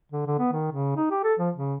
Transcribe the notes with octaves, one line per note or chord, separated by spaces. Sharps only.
D3
D3
B3
D#3
C#3
D#4
G4
A4
F3
C#3